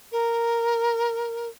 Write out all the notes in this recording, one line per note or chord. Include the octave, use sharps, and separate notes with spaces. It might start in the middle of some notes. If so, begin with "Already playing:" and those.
A#4